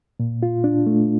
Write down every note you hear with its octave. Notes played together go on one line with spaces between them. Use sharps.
A#2
F4
D4
A3